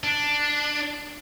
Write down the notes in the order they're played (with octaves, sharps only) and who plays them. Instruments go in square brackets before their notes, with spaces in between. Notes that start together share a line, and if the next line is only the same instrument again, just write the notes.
[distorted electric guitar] D4